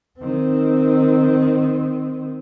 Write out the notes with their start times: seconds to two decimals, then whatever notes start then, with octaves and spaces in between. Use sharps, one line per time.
0.19 D#3 C4